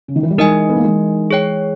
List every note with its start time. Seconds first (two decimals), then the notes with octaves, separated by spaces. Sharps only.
0.08 C#3
0.16 D#3
0.23 E3
0.30 G3
0.38 E3 G#3 D#4 A#4 D#5 G#5
0.69 B3
0.76 A#3
0.84 E3 G#3
1.31 G#4 C#5 G5